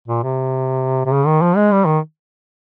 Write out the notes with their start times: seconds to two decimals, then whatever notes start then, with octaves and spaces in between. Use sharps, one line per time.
0.08 A#2
0.23 C3
1.06 C3
1.12 C#3
1.27 D#3
1.42 F3
1.57 G#3
1.72 G3
1.86 D#3